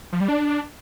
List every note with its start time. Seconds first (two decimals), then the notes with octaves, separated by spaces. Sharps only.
0.12 F3
0.20 G3
0.28 D4